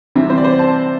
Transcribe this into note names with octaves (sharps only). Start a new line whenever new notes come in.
C3 E3 G3 C4 E5
C5
D5
C5
A5